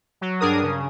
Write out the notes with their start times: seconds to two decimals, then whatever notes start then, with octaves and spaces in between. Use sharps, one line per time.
0.21 F#3
0.40 G2 D4 G#4 A#4 D#6
0.63 C#3